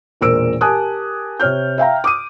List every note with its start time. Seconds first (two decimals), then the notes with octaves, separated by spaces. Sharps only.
0.21 E1 A#2 A#4 C5 E6 D7
0.61 G4 A#4 G#5 A5 D#6 F#6
1.40 C3 C4 C#5 F6 G6
1.78 E5 F5 G5 A#5
2.04 D6 D#6 D#7